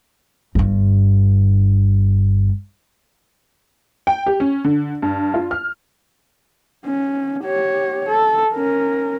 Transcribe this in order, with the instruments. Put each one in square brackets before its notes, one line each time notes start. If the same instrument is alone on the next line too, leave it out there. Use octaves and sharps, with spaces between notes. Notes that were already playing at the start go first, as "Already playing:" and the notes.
[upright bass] G1 G2
[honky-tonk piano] G5
G4
C#4
D3
G2
F4
F6
[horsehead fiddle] C#4
G4 C#5
A4
C#4 A#4